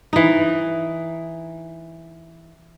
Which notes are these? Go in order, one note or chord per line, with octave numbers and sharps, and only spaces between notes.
E3 D#4